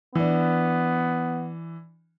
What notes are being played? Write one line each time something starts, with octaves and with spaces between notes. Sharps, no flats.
E3 B3 D4